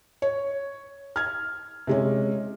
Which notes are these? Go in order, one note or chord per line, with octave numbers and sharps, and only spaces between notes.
C#5
F6 G#6
C3 G#3 C#4